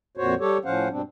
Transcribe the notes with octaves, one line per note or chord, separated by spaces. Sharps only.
F2 A#2 F#4 C5 C#5
G3 G4 A4 C#5
A2 F3 C#4 C5 F5 F#5
G2 B2 G3 C4 D4